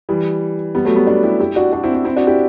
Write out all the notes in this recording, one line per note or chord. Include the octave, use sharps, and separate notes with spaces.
E3 G3
G3 B3
F#3 A3
G3 B3
B3 D4
E4 G4
E4 G4
D4 F#4
D4 F#4
C4 E4
C4 E4
C4 E4
D4 F#4
E4 G4